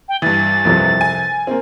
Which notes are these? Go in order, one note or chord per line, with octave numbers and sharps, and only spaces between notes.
G5
G2 E3 A6
C2 F2 C3
G#5
A#3 C4